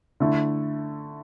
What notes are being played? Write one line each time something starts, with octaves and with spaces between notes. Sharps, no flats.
D3 A3 E4